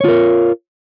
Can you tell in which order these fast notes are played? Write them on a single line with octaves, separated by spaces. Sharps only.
C#5 F4 A#4